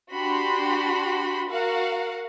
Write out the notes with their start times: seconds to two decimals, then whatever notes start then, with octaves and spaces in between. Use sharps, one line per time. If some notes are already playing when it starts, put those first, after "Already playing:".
0.13 D4 F#4 G4 B5 C6
1.50 F#4 A#4 F5 F#5